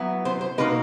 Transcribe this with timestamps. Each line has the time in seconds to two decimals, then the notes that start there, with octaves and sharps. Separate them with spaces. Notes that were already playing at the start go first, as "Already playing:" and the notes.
Already playing: F#3 B3 E4
0.25 C5
0.41 C5
0.58 B2 G3 A#3 D#4 B4